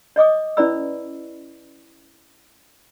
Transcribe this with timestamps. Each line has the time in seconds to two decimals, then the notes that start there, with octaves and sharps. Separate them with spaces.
0.16 C#5 D#5 D6 D#6
0.57 C#4 E4 B4 D5 B5 E6